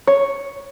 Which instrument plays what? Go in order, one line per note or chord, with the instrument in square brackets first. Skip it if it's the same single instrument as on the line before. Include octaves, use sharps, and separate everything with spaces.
[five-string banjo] C#5